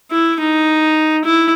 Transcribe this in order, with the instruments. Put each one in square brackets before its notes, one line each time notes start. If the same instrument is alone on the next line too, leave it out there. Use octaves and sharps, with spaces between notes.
[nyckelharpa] E4
D#4
E4